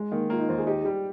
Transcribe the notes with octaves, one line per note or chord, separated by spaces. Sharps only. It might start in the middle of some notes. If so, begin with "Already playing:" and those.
Already playing: G#3
D#3 A#3
A#3 F4
D#4
D#2 C5
G#4
D#4 G4
G3 G4